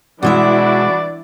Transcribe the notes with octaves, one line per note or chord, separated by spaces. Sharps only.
B2 E3 G#3 D4 E4 F#4 D5 E5